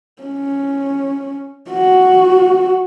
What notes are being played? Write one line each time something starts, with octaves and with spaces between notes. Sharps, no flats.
C#4
F#4